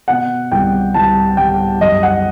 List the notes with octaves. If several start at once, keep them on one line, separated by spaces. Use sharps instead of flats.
B2 F#5
C2 G5
C2 A5
G3 G5
F#2 D#5
F#5